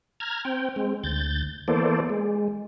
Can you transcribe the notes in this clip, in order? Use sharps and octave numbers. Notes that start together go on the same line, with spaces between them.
A#5 F6 G#6
C4 G5
G#3 C4
D2 G6 A6
E3 A#3 B3 A4 C5 D5
G#3